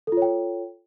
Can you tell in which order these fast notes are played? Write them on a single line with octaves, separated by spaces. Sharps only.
A4 F4 C#5 G5